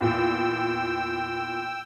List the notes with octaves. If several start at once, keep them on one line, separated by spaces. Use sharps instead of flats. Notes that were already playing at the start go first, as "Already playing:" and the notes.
E2 A#2 G5 E6